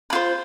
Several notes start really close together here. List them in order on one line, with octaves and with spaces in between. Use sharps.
B4 F4 C5